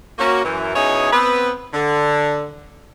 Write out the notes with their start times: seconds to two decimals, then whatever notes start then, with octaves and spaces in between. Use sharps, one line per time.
0.19 A#3 C#4 F#4
0.44 F#2 E3
0.75 B2 C#4 D#4 E4 G#4 C#5
1.12 B3 C4 B4
1.74 D3